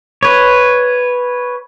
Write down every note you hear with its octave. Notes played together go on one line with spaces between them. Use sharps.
B4 C#5